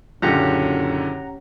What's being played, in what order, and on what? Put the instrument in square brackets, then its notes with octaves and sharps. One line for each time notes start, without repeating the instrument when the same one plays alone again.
[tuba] F#1 [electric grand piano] F#2 A#2 D3 [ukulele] C#4 G4 [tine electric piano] F#5 A#5